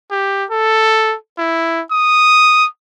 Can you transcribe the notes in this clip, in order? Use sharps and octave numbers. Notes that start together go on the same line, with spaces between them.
G4
A4
E4
D#6